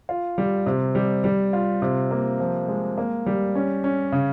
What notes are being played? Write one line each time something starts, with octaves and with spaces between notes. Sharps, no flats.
F4
G3
C3
G3
G3
F4
C3
A#3
F3
G#3
A#3
G3
C#4
C#4
C#3